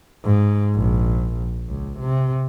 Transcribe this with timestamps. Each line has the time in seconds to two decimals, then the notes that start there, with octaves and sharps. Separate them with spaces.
0.24 G#2
0.75 A#1
1.68 C#2
1.99 C3